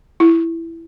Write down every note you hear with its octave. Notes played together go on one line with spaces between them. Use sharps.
E4